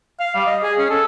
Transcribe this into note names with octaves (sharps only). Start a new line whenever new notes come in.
F5
G3
D#5
G#4
C#4
A4